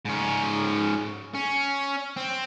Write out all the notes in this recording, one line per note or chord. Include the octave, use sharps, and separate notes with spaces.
G#2 C#4
C#4
C4